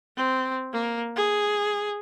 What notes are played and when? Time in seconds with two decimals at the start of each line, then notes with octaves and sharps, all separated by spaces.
0.17 C4
0.73 A#3
1.16 G#4